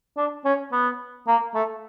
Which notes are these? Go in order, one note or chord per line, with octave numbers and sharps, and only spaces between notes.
D4
C#4
B3
A#3
A3